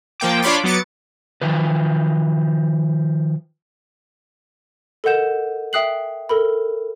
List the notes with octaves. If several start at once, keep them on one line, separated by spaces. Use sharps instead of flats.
F3 A#3 G5 D6
D4 F4 C#5 B5 C6 D6
F#3 B3 D6 A6 C#7
D#3 F3 B4
A4 A#4 D#5 F#5 G6 E7
E5 G5 D#6 F#6 C7 F#7
A4 A#4 B5